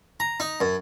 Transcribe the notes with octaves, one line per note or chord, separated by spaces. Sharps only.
A#5
D#4
F#2